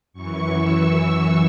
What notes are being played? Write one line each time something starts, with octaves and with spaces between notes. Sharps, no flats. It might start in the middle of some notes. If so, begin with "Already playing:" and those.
F#2 E3 C#6
E6